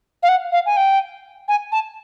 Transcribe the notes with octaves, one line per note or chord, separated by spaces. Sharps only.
F5
F#5
F5
G#5
G5
G#5
A5